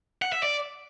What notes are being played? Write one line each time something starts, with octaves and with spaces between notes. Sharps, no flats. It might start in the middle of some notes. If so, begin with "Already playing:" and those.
F#5
E5
D5